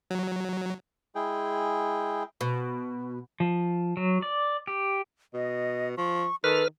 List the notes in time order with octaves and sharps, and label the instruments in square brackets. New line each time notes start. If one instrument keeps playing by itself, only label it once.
[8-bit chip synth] F#3
[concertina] G#3 E4 G#4 G5
[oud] B2
[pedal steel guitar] F3
F#3
D5
G4
[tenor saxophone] B2 [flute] D#5
[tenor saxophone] F3 [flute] C#6
[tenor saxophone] D#3 [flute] A4 [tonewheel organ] B4 F6